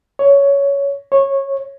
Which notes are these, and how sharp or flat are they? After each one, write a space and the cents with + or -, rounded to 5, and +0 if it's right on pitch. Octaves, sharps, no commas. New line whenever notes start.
C#5 +15
C#5 -15